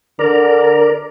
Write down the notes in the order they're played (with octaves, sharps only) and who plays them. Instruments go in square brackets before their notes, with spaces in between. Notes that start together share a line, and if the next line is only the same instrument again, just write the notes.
[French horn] D3 [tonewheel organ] A#4 D5 A#5